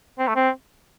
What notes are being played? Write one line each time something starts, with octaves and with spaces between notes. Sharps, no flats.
C4
A3
C4